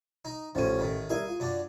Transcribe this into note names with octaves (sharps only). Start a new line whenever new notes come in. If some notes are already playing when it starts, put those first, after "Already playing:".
D#4
A1 F3 A3 C#4 D#7
A2 D#3
G3 E4 G#4 A#4 G#5
F4
F#2 D4